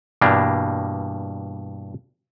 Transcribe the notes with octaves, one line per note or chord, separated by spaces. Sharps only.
G2 B2 E3 G3 A#3 D4